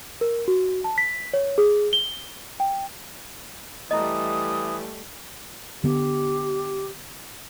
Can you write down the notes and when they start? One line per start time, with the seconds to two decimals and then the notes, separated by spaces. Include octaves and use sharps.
0.21 A#4
0.48 F#4
0.84 A5
0.98 B6
1.33 C#5
1.58 G#4
1.93 G7
2.60 G5
3.91 E3 G3 A3 E4 D#5 D#6
5.84 D3 B3 G4